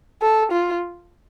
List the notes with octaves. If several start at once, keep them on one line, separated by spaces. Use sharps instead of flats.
A4
F4